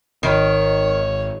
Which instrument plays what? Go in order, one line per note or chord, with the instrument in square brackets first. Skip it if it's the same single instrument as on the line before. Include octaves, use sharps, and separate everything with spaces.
[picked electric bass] G#1 [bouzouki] D#3 [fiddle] C#5